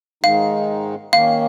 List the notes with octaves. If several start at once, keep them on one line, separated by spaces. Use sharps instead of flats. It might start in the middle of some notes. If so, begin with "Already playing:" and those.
G#2 D#3 G#3 D#4 F5
D#3 A#3 C#4 F5